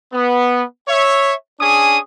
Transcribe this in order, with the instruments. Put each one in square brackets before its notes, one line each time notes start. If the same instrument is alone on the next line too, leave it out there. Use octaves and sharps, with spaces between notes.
[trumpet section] B3
C#5 E5
C#4 D4 G#4 G#5 D#6